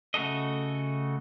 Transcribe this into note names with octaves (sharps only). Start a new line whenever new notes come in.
C#3 A3 F#4 A4 D#5